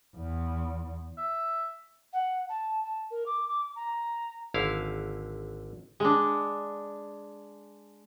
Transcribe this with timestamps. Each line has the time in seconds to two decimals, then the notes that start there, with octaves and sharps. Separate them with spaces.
0.17 E2
1.18 E5
2.13 F#5
2.49 A5
2.84 A5
3.11 A#4
3.26 D6
3.48 D6
3.76 A#5
4.54 G#1 D3 E4 F5
6.00 G#3 D4